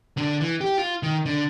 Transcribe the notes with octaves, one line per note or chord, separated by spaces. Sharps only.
D3
E3
G4
F4
D#3
D3